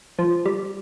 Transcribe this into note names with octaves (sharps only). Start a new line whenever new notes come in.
F3
G3